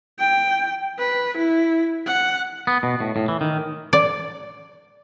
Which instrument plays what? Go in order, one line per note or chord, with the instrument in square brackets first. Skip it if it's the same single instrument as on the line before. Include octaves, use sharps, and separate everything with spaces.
[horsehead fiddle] G5
B4
E4
F#5
[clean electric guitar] B3
B2
A2
A2
E3
D#3
[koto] D5